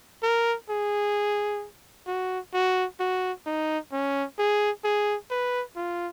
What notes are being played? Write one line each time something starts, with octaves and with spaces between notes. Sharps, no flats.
A#4
G#4
F#4
F#4
F#4
D#4
C#4
G#4
G#4
B4
F4